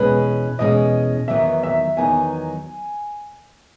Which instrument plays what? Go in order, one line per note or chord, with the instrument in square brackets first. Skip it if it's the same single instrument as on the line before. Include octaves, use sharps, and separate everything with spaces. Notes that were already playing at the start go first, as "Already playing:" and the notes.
Already playing: [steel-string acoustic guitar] E2 B2 G#3 C#4 [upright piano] B4
[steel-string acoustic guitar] E2 B2 G#3 C#4 [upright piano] D#5
[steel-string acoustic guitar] E2 D#3 F#3 B3 D#4 [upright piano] E5
[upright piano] E5
[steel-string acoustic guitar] E2 D#3 F#3 B3 D#4 [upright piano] G#5